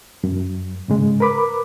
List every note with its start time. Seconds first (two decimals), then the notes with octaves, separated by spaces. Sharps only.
0.24 F#2
0.88 G#2 C#3 G#3
1.20 A#4 B4 B5 D6